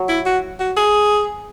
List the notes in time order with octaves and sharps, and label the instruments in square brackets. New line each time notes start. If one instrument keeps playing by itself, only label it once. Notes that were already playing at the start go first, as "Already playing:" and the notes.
Already playing: [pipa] F#3
[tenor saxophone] E4
F#4
F#4
G#4